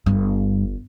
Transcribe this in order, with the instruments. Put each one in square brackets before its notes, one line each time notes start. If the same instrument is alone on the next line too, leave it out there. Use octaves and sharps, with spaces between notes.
[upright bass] G1 [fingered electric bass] G2